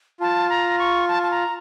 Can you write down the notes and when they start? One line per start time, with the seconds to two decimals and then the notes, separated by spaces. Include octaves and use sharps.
0.20 F4 A5
0.50 A#5
0.79 C#6
1.08 A5
1.23 A5
1.31 A#5